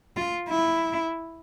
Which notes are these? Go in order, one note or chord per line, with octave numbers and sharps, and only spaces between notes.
F4
E4